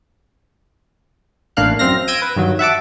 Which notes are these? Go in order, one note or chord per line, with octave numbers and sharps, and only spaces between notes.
A1 A2 A#3 D4 F5 F#6
F#2 C4 F5 F6 A#6
E6 G6 G#6 A#6 D7 D#7
B4
G2 D#3 F#3
E5 F#5 A5 D6